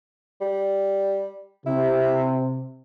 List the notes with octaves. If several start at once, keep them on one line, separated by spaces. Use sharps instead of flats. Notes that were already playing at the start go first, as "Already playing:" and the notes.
G3
C3 E4